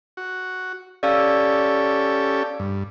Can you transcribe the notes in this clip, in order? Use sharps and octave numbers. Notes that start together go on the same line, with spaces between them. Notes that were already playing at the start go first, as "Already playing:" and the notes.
F#4
C#4 G4 A4 D5 F5 E6
G2